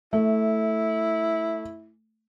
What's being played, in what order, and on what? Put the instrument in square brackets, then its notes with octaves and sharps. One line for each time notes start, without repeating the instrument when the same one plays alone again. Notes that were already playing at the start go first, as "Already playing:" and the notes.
[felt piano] A3 [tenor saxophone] E4